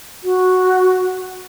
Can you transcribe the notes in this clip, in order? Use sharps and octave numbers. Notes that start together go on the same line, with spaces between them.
F#4